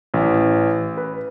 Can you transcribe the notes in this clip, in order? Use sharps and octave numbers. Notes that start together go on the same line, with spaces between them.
A1
B4